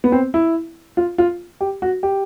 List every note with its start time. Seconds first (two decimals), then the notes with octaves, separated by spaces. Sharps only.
0.04 B3
0.12 C4
0.34 E4
0.97 F4
1.18 F4
1.61 G4
1.82 F#4
2.03 G4